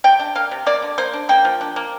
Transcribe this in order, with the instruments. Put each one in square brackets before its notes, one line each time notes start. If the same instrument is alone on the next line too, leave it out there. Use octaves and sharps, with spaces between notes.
[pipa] C3 G5
D4
A#3 F5
C3
A#3 D5
D3
A#3 C5
D4
A#3 G5
F3
D4
A#3